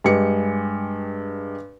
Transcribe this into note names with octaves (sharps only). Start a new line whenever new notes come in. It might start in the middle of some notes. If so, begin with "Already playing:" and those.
G2 G#3 G4 C#7